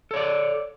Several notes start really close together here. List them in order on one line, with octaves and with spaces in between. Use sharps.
A4 C#5 D5